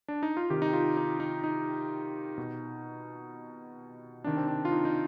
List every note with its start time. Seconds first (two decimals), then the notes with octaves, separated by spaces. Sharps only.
0.08 D4
0.23 D#4
0.37 F4
0.50 C3 D#3 G4
0.62 D#4
0.73 F4
0.97 D#4
1.20 D#4
1.44 D#4
2.38 B2
4.24 C3 D#3 D4
4.37 C4
4.48 D4
4.65 F4
4.72 D#4
4.85 D#4